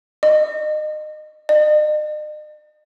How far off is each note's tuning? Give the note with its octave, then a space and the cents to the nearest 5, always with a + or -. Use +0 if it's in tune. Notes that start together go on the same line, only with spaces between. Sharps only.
D#5 -25
D#5 -45